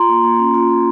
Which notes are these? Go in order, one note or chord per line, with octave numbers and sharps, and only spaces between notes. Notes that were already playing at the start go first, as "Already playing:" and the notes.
Already playing: F4 A#5 C6
A#3
A#3
C#4
F4
A#3